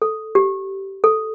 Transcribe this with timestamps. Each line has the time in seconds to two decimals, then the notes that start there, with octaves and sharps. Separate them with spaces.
0.02 A4
0.35 G4
1.04 A4